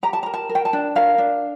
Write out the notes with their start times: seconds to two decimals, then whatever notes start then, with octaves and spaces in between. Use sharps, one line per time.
0.03 G4 A#5
0.13 A5
0.23 A#5
0.26 A#4
0.34 A5
0.49 A#4
0.55 G5
0.65 A5
0.73 D4
0.95 A#4 F5
1.18 D4